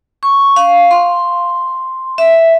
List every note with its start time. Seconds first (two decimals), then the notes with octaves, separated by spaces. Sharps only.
0.23 C#6
0.56 F5
0.91 C6
2.18 E5